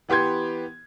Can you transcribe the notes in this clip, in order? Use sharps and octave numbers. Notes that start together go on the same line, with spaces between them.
E3 B3 G4 C6 G#6